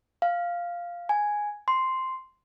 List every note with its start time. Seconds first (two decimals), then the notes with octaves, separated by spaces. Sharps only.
0.22 F5
1.09 G#5
1.68 C6